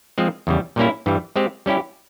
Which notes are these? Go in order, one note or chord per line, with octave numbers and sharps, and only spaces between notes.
F3 G#3 C4
E2 C#3 G3
A#2 G3 A#3 C#4 E4
G2 E3 G3
G#3 C4 G4
G3 C#4 E4 G4